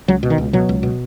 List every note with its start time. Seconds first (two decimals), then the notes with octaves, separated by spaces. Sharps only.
0.08 C#2 F#3
0.23 B2
0.30 D#3
0.38 C#2
0.53 B2 F#3
0.69 C#2
0.83 B2